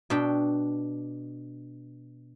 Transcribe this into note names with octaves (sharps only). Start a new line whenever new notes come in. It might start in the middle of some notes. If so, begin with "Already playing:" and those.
B2 D4 G5